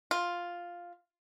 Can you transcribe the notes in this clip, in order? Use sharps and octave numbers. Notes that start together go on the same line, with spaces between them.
F4